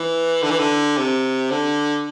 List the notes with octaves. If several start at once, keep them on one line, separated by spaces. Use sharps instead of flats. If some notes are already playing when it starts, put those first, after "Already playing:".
Already playing: E3
D3
E3
D3
C3
D3